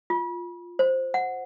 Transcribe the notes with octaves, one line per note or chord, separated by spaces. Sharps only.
F4
C5
F#5